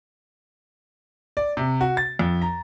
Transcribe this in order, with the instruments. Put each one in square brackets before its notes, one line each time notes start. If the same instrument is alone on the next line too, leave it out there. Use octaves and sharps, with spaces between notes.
[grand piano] D5
C3
F#4
A6
F2
A#5